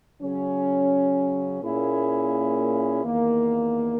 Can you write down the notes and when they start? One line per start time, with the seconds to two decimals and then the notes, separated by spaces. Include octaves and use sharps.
0.21 C#3 F#3 C#4
1.61 A#2 A#3 C#4 E4 G#4
3.02 E2 D#3 A#3